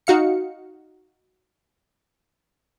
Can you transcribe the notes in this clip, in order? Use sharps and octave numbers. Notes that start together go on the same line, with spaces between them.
D#4 F#4 F5 C#7